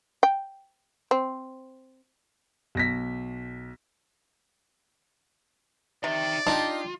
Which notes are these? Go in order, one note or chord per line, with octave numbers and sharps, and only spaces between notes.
G5
C4
B1 A#6 B6
C3 D#4 D5 G5
D4 D#4 F4 G4